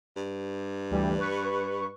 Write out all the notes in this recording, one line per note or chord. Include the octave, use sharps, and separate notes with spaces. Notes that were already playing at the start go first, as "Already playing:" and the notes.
G2
D2 E3 G3
B4 C#6